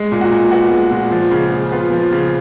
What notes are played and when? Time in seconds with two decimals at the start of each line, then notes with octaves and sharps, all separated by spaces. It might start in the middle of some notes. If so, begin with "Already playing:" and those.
Already playing: G#3
0.12 A#2
0.21 F#4
0.31 A#2
0.51 B3 F#4
0.71 G#3
0.91 A#2
1.11 F3
1.31 C#3
1.52 C#3
1.72 B3 F4
1.92 F3
2.12 C#3